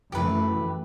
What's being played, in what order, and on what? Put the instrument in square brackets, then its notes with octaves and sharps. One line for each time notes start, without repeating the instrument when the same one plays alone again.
[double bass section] F#2 E3 A3 [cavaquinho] G4 B4